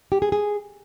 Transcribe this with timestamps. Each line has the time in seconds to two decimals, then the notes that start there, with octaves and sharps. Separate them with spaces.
0.12 G4
0.22 G#4
0.32 G#4